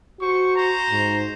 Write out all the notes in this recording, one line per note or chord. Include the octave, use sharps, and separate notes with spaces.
F#4 C5 C#6
C5 A#5
G#2